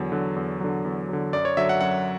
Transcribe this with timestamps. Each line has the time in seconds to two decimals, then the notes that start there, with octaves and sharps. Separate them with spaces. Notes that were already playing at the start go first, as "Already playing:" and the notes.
Already playing: E2 D3 F#3
0.12 D3 F#3
0.36 E2
0.60 D3 F#3
0.85 E2
1.09 D3 F#3
1.33 F#2 D5
1.45 C#5
1.57 D3 F#3 E5
1.69 F#5
1.80 F#2 F#5